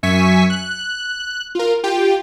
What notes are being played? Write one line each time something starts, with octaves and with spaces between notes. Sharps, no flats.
F#2 E5 G#5 C#6 B6
F#6
F4 A#4
F4 G4 G5